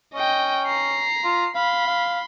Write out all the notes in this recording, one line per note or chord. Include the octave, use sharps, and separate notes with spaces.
C#4 D#5 G5
A#5 C7
F4
F5 B5 C6
F5